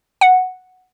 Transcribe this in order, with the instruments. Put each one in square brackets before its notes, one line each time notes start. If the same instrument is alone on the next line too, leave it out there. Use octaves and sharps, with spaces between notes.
[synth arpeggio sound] F#5